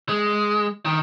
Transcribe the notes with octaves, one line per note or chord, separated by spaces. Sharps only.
G#3
D#3